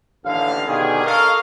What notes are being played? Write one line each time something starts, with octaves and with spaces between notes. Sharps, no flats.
A1 D#2 D3 F5
B2 D3 D#3 C#4 G4 G#4
A4 A#4 C#5 D#5 F5